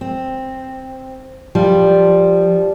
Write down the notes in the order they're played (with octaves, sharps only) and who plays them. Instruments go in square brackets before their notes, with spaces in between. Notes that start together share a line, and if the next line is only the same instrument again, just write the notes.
[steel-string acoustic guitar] C4
[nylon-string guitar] F3 [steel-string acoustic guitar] G3